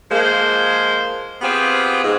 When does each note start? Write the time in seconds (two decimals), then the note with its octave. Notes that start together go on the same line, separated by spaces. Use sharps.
0.11 F3 G#3 A#3 C5
1.42 B3 C4 F4 G4 G#4
2.03 G#2